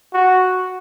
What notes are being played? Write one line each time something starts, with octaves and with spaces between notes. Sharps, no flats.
F#4